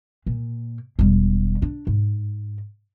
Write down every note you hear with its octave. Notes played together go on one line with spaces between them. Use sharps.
A#2
E1 G3
D4
G#2